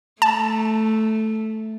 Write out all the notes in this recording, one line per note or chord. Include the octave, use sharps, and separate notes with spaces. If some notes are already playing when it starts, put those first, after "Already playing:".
A3 A5